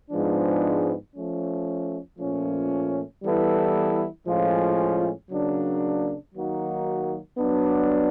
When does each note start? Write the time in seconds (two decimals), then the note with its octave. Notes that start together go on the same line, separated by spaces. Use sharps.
0.10 G#2 F3 G#3 B3 D4
1.14 F3 A3 C#4
2.18 A#2 F3 A3 C#4
3.22 E3 G3 B3 E4 A4
4.27 A2 F3 G#3 C#4 F4
5.30 C#3 F#3 A#3 D4
6.35 D#3 F#3 A#3 D#4 F#4
7.38 F#3 B3 D4